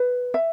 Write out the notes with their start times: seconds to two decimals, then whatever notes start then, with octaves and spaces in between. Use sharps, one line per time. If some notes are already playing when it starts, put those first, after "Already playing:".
Already playing: B4
0.34 E5